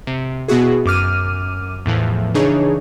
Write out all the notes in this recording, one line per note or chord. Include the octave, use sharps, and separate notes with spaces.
C3
B2 B3 E4 F#4 G#4
F#2 D6 F6 D#7
E2 A2 E3 F3
C#3 E3 D4 D#4 G#4 C#5